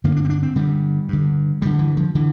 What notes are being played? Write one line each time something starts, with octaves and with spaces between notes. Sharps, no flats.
G2 D3 A#3
D4
C4
D4
C4
G2 D3 G3
G2 D3
G2 D3 G3
E3
F3
D3 E3